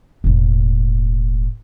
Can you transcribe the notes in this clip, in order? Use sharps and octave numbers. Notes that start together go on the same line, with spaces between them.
E1 A2